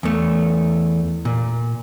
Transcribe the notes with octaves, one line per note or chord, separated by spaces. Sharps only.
E2 A3
A#2